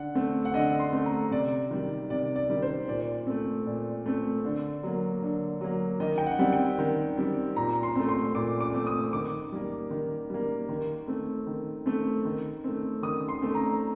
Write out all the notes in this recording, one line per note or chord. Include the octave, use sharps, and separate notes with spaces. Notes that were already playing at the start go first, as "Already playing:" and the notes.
Already playing: D3 F#5
A3 C4
F#5
D3 D#5
C6
A3 C4
A#5
C3 D5
D#3 G3
C3 D5
D5
D#3 G3
C5
A#2 D5
A3 C4
A#2
A3 C4
D3
F#3 A#3
D3
F#3 A#3
D#3 D#5
G5
F#5
G3 C4
G5
D#3
G3 C4
A#2 A#5
C6
A3 C4
C6
A#2 D6
D6
A3 C4
D#6
D#3 D6
G3 A#3
D#3
G3 A#3
D#3
A3 C4
D#3
A3 C4
D#3
A3 C4
D#3 D#6
C6
A3 C4
A#5